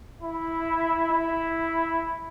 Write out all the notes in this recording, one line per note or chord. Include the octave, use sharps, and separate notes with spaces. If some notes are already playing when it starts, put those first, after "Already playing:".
E4
E4